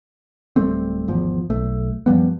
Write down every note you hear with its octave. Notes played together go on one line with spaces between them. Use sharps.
D1 G3 A3 C4
G#1 E2 F3
B1 A3
F#2 F3 G3 B3